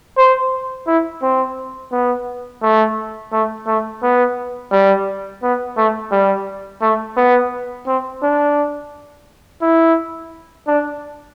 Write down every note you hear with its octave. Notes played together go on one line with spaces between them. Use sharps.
C5
E4
C4
B3
A3
A3
A3
B3
G3
B3
A3
G3
A3
B3
C4
D4
E4
D4